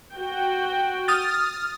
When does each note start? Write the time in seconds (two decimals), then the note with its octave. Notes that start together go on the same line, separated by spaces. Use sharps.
0.14 F#4 G5
1.08 D#6 F6 A6